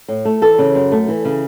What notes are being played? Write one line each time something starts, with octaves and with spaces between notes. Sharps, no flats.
A2
A3
E3 A4
C#3
F#2
A3
E3
C#3